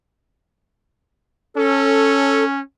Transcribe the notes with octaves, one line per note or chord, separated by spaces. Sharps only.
C#4 A4